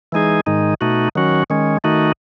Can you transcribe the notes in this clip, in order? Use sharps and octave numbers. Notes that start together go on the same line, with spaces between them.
E3 G#3 D#4 G#4
G#2 D#3 G#3 D#4
B2 A3 D#4 F#4
D#3 F#3 C#4 F#4
D#3 G#3 C#4
D#3 A3 D#4 F#4